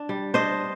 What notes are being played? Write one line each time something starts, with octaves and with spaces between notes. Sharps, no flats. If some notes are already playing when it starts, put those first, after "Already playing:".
Already playing: D4
G3
D4 C5 D#5